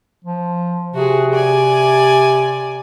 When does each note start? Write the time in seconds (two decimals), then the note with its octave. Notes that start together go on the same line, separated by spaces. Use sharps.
0.24 F3
0.94 C3 F#4 G#4
1.32 D5 G#5